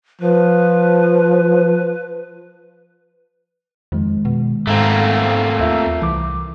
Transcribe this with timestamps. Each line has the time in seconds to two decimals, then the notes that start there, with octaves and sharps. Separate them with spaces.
0.21 F3 B4
3.92 F2 D#3 G#3
4.25 B2
4.67 G#2 A3 A#3 C4
5.60 D#2 F4 E5 E6
6.02 C2 E3 D6